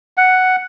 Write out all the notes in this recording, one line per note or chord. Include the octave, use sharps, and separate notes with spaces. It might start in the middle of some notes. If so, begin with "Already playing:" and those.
F#5